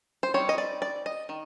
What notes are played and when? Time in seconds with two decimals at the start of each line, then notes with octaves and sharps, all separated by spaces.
0.23 C5
0.34 G3 C4 D#4 C#5
0.49 D#5
0.58 D5
0.82 D5
1.06 D#5
1.29 D#3